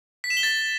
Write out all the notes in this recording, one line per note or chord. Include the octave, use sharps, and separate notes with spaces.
B6
E7
G7
A6